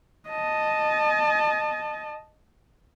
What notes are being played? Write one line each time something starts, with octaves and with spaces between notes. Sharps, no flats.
D#5 A5